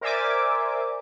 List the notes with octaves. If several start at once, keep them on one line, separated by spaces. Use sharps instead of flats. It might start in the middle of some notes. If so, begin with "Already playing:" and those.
A#4 C5 D5 E5 G#5 D6